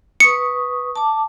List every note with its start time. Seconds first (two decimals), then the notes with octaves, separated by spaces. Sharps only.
0.20 B4 C#6 D#6 C#7
0.96 A5 D6